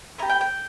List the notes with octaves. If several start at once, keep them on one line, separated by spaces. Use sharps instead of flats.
B3 E4 G4 A#5
G5
G5